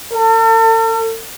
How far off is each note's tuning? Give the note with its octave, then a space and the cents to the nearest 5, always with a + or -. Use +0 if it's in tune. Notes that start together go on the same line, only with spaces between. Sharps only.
A4 +45